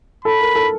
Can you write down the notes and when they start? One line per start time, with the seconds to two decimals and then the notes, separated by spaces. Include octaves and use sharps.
0.25 A4 B5
0.41 A#4
0.55 A4